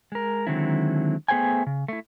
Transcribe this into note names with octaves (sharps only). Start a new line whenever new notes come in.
G#3 A#4
D3 D#3 F#3 G#3 C4 E4
A3 B3 G#4 C5 G5 G#5
C#3
A3 E4